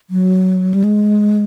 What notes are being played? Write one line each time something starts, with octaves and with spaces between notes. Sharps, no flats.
F#3
G3
G#3